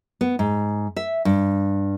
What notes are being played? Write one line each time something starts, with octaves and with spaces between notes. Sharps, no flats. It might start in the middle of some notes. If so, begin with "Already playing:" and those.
B3
G#2
E5
G2